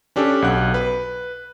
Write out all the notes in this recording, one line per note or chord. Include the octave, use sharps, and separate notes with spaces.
C#4 D4 G4 A4
B1 F#5 F#6
B4